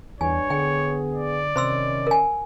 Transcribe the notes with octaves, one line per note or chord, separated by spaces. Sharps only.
E2 G2 C#5 G#5
D3 B3 G#4 G5
D5
C3 D#3 C#4 C5 C6 E6
A#4 G#5